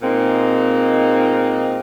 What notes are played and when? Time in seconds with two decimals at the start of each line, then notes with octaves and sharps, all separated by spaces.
0.02 A#2 G#3 A#3 C4 D#4